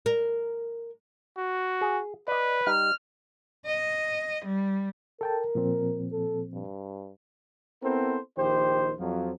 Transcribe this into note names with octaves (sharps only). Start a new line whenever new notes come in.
A#4
F#4
G#4
B4 D5 D#5
G3 D#4 F6
D#5
G3
A4 A#4 G5 A5
A#2 F3 C4
A4
G2
B3 C4 E4 A4 A#4 C5
A#1 D#3 G4 C5
F2 F3 F#3